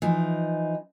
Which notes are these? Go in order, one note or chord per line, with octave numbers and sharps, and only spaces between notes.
E3 F3 D#4